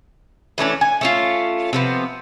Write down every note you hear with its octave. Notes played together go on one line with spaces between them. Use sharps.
E3 A3 C#4 D4
G#5
A3 C#4 F4
C3 F3 B3